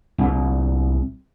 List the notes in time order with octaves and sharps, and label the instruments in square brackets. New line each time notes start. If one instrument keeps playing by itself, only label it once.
[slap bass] C2 A#2